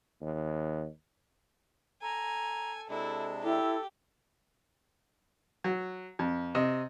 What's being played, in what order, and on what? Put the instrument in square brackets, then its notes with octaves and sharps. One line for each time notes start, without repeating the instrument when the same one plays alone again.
[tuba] D#2
[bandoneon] A4 [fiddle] G#5 [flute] A#5
[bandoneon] C3 G#3 D4 [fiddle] E4 [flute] A4
[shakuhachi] E4 [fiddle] G4 [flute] A4
[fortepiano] F#3
F2
C3 D#5